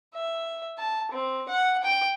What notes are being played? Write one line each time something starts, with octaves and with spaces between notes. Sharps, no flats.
E5
A5
C4
F#5
G5